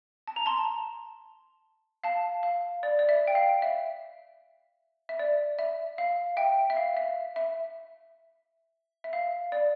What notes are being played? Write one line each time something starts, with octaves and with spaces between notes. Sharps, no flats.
A5
A#5
A5 C6
F5 A5
F5
D5
D5
E5
G5
F5
E5
E5
D5
E5
F5
E5 G5
E5
F5
E5
E5
E5
F5
D5